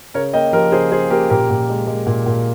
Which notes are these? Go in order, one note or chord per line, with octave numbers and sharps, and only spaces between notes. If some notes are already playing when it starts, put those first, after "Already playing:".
C#3 A#4 C#5
A#3 D#5 G5
F3 G4 A#4
C#3 G#4 C5
C#3 G#4 C5
A#3 G4 A#4
A#2 G4 A#4
A#2
G#3
G#3
A#2
A#2